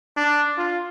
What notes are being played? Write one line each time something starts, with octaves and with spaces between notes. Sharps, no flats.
D4
F4